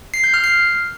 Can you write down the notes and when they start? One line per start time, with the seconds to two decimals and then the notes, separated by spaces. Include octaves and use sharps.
0.14 C7
0.24 G6
0.34 F6
0.44 C7